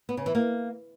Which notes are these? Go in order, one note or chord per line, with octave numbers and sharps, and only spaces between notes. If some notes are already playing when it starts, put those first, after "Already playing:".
B3
C#3
E3
A#3